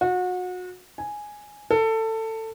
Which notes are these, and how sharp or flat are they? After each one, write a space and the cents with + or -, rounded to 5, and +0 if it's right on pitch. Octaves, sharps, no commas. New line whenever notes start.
F#4 -30
G#5 +0
A4 +20